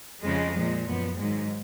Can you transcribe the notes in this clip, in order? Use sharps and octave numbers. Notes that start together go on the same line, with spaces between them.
F2 C#3 F3 G#3
A#2 F3
F#2 F3 B3
G#2 D#3 F#3 G#3